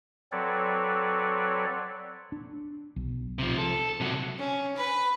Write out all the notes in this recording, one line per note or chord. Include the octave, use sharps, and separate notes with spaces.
F#3 C4 A4 B4 C#5 D5
D4
B1
C3 F3
A4
C3 F#3
C#4
B4